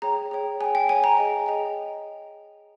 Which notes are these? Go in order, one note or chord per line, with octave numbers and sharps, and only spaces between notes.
G#4 C#5 G5 A#5
G#4 C#5 G5
G#4 C#5 G5 G#5
G5
G#4 C#5 G5 G#5
A#5
G#4 D#5 G5
G#4 D#5 G5